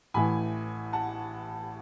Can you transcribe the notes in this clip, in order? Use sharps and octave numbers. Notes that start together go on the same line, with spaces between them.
A1 A2 E3 G#5 B5
F#5 A5